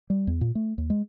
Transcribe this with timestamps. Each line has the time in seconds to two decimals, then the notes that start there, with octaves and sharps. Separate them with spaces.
0.10 G3
0.27 E2
0.41 A#2
0.55 A3
0.78 D#2
0.90 G#3